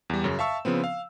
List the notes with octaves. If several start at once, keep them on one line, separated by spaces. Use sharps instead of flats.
E2 G3
F#2 C#3
E5 F5 A5 C#6 E6
C#3 F3 B3 C4
F5